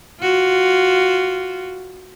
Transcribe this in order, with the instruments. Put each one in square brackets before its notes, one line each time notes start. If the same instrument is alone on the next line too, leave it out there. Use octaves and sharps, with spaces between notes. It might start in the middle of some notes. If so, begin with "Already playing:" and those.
[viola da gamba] F4 F#4